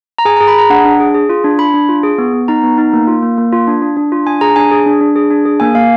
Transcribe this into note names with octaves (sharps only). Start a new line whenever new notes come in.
A#5
G#4 G#5
A#5
G#4
B5
G#4 A#5
D4 F#5
D4
G#4
G#4
F4
D4
D4 B5
D4
F4
G#4
B3
B3
D#4 A#5
B3
D#4
A#3
F4
A#3
A#3
F4
D4
D4
D4
F4
D4 G#5
G#4 A#5
D4 G#5
G#4
D4
D4
G#4
D4
G#4
A#3 G#5
A#3 F5